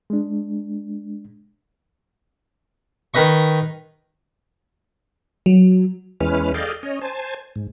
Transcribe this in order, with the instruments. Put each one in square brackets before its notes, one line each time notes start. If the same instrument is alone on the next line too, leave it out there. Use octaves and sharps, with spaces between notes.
[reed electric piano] G#3 D4
[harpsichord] D#3 D#4 B4 D#5 C#6
[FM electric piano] F#3
[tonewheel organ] E2 E3 G#3 C#4 B4 F6
G#4 A4 D5 D#5 F5 G5
C#4 C#5 D#5
C5 G#5 A5
G#2